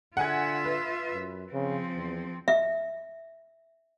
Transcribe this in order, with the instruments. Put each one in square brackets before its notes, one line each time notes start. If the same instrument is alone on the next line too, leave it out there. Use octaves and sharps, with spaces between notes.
[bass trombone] D3 [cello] F4 E5 [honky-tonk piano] F#5 G#5 G#6
[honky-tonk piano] B4
[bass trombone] F#2
[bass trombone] C#3 [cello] F3 C4
[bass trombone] E2
[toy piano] E5